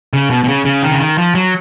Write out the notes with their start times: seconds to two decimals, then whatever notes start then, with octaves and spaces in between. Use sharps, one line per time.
0.13 C#3
0.30 B2
0.44 B2
0.48 C#3
0.65 C#3
0.83 D#3
0.92 C#3
1.00 D#3
1.18 F3
1.35 F#3